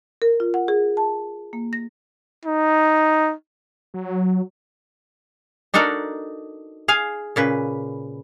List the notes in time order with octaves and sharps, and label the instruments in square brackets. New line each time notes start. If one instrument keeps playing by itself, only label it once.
[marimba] A#4
F4
F#5
G#4
A5
A#3
A#6
[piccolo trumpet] D#4
[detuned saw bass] F#3
[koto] D4 D#4 F#4 A4 A#4 D5
G#4 F5 G#5
A#2 C#3 B4